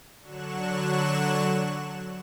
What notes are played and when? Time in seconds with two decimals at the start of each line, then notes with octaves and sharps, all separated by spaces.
0.21 D3 F#3 C#6 F#6 E7